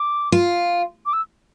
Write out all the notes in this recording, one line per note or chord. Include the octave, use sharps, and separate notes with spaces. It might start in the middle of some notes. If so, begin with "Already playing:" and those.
Already playing: D6
F4
D6
E6